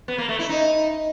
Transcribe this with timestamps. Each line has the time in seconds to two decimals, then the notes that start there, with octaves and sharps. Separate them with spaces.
0.08 B3
0.18 A#3
0.29 A3
0.39 E4
0.49 D#4